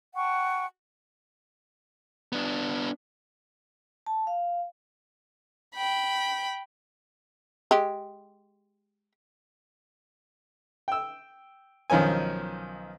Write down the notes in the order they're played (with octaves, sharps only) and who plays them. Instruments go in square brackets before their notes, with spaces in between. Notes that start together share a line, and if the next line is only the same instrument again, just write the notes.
[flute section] F#5 G5 A5 C#6
[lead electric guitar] B3 D4
[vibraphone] A5
F5
[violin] G5 B5
[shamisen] G#3 G4
[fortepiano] G5 E6
B1 D#3 F3 C#4 G#5